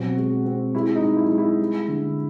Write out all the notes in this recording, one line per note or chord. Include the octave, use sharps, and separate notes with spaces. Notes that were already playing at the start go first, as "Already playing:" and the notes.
Already playing: B2 F#3 C4 F#4
G#3
C4
G#3 E4
D#4
G#3
E4
G#3
E4
G3
D3